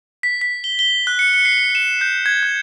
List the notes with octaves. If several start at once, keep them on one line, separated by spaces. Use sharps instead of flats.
B6
B6
G7
G7
F#6
C#7
C#7
C7
E7
G6
G#6
G6